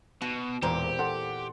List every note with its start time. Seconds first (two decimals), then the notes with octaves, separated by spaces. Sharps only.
0.22 B2 F#4
0.62 E1 E2 A#2 C4 G4 A#5
0.99 A4 F#5 C6